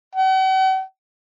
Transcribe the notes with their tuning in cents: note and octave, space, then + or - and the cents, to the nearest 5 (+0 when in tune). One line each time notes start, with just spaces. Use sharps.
F#5 +45